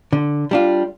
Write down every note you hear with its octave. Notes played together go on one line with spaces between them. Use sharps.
D3
G3 D4 F4